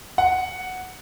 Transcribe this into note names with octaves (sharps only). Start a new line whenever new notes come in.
F#5